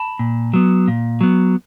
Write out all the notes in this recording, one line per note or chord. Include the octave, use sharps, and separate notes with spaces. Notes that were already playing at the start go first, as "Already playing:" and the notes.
Already playing: A5 B5
A#2
F#3 B3
A#2
F#3 B3